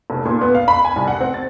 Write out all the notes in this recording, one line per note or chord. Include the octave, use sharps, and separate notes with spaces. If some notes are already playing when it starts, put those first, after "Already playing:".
F1
A#2
B3
F5
B5
G#5
C2
F#5
C4
A6